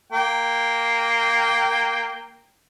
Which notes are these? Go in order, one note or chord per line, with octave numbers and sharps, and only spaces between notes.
A#3 G5